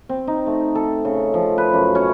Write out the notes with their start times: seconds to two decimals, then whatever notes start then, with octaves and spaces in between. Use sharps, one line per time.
0.09 C4
0.27 D#4
0.46 A3
0.75 A4
1.05 C#3
1.34 F3
1.58 B4
1.73 F#2
1.95 C#4